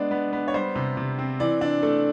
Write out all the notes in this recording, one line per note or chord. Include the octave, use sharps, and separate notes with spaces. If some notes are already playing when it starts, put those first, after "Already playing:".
Already playing: G#3 B3 D4 D5
B3
B3
C#5
G3 C5
C3
C3
C4
E3 D5
D4
A3